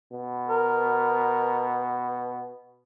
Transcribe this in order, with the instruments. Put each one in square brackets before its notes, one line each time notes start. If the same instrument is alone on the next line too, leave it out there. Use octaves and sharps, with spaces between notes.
[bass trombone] B2
[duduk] A#4